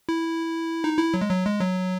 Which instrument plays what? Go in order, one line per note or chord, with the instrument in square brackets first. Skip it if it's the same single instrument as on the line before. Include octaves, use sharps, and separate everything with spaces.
[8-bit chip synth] E4
D#4
E4
F#3
G#3
F#3
G#3
F#3